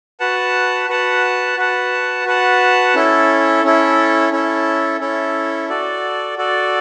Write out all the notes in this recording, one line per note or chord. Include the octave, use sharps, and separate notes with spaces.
F#4 B4 F#5 A5
F#4 B4 F#5 A5
F#4 B4 F#5 A5
F#4 B4 F#5 A5
C#4 E4 A4
C#4 E4 A4
C#4 E4 A4
C#4 E4 A4
F#4 A4 D5
F#4 A4 D5